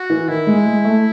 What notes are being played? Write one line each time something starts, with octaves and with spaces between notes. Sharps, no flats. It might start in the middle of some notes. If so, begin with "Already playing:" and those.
Already playing: F#4
E3
D#3 E4
G#3
G#3
A3